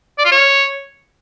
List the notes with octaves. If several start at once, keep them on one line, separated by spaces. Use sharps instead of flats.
D5
F4
C#5